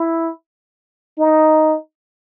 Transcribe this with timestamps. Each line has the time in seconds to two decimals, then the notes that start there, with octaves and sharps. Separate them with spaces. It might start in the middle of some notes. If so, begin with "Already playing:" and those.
Already playing: E4
1.19 D#4